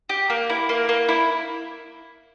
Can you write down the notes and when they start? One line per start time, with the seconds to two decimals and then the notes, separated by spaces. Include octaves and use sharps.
0.09 G4
0.30 A#3
0.49 E4
0.69 A#3
0.89 A#3
1.09 E4